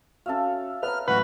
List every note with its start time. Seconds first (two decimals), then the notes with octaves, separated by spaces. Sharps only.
0.26 C#4 F#4 A4 E5 F5
0.83 B3 B4 C#5 A#5 F6
1.08 A1 F#3 F#4 B4